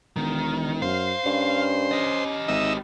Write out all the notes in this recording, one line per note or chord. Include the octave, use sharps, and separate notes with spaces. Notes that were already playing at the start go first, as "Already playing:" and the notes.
E1 D#3
F#2 C5 F5
G2 C#4
G4 D#5
G#1 D#4 E5